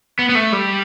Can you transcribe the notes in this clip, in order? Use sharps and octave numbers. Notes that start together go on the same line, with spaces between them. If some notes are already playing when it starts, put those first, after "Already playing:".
B3
B3
A3
G3